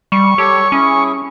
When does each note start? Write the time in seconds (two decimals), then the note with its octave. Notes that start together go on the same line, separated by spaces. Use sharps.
0.12 G3 C#6
0.38 G4 A4 C#5
0.72 C#4 E4 G#4